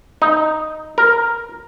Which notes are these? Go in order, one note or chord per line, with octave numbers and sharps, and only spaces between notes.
D#4
A#4